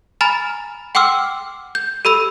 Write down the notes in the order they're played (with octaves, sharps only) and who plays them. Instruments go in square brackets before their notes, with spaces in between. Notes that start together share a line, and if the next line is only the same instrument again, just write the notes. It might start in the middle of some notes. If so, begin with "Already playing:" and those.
[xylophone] G#5 A#5 B5 F6 A6
F#5 G5 C6 D6 E6 F6
G6
G4 A4 B5 E6 D#7